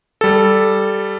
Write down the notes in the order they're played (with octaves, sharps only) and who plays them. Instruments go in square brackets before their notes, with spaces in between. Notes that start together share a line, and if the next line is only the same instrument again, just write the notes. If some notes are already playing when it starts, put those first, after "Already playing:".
[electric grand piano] G3 A4